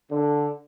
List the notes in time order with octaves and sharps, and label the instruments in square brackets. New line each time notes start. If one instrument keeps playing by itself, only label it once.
[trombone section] D3